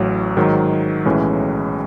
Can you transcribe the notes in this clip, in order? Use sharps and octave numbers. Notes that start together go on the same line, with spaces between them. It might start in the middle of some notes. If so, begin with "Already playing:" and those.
Already playing: A1 A2 F#3
G#2 D#3 F#3
B1 A2 E3 G#3 C#4